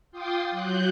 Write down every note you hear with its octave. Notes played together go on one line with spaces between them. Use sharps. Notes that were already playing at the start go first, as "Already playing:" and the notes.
F4 G5 C6 D6 D#6
F#3 F#6 G6